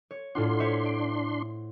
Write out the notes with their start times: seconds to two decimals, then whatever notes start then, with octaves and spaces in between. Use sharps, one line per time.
0.11 C#5
0.35 A2 D4 F4 F#5 C6
0.60 C5 C#5 E5
0.85 D7